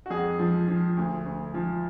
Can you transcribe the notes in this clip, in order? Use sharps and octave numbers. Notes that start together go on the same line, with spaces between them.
F#4
F2 G#4
F3
F3
D2
D2
F3